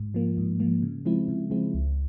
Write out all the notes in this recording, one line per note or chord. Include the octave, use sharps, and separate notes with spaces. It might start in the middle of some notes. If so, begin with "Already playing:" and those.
Already playing: G#2
F3 A#3
G#2
F3 A#3
C#3
F3 G#3 C4 E4
C#3
F3 G#3 C4 E4
C#2